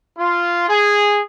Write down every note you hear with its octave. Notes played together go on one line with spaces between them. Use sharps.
F4
G#4